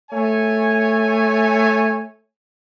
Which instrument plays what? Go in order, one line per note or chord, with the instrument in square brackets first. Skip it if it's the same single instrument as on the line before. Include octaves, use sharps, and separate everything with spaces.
[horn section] A3 C#5 G#5